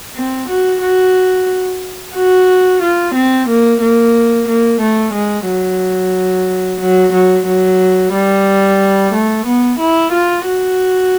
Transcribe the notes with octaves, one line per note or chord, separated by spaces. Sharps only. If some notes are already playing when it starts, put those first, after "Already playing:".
C4
F#4
F#4
F#4
F4
C4
A#3
A#3
A#3
A3
G#3
F#3
F#3
F#3
F#3
G3
A3
B3
E4
F4
F#4